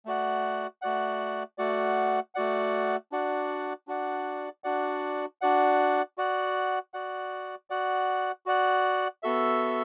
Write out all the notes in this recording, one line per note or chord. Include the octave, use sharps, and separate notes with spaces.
A3 F#4 D5 F#5
A3 F#4 D5 F#5
A3 F#4 D5 F#5
A3 F#4 D5 F#5
D4 F#4 D5 F#5
D4 F#4 D5 F#5
D4 F#4 D5 F#5
D4 F#4 D5 F#5
F#4 D5 F#5
F#4 D5 F#5
F#4 D5 F#5
F#4 D5 F#5
B3 F#4 A4 E5